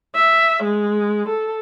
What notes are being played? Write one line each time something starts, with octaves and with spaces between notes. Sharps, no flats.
E5
G#3
A4